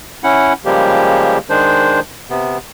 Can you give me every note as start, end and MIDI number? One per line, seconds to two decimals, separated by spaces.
0.24 0.53 61
0.24 0.53 64
0.24 0.53 78
0.65 1.38 49
0.65 1.38 53
0.65 1.38 55
0.65 1.38 56
0.65 1.38 58
0.65 1.38 67
1.50 2.00 51
1.50 2.00 56
1.50 2.00 62
1.50 2.00 72
2.30 2.58 48
2.30 2.58 59